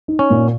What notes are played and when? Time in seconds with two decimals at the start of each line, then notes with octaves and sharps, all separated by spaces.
0.08 D#4
0.19 C#4
0.30 A#2